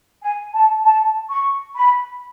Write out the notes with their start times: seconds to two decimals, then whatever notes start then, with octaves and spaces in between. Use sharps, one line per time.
0.24 G#5
0.55 A5
0.84 A5
1.30 C#6
1.75 B5